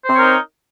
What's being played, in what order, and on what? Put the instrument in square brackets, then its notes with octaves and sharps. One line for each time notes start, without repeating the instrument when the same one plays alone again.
[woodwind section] C5
C4
C#5
A#4
D#4